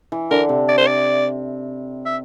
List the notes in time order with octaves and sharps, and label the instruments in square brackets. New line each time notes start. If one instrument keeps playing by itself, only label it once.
[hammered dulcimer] E3
[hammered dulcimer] D3 [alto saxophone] A#4
[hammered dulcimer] C3
[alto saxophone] D5
C5
D5
E5